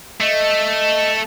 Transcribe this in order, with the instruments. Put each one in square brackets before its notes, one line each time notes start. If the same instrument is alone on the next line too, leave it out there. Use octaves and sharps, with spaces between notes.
[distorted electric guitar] A3 [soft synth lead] D#5